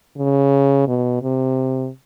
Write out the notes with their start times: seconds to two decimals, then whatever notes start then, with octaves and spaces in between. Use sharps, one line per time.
0.17 C#3
0.87 B2
1.22 C3